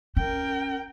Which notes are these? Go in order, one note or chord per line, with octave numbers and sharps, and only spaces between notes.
C#4 A#4 G5